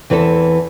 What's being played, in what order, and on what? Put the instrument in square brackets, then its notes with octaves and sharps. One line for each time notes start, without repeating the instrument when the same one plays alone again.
[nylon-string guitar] E2 E3 C4 A4